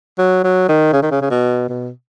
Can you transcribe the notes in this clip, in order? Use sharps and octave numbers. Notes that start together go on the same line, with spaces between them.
F#3
F#3
D#3
C#3
D#3
C#3
C#3
B2
B2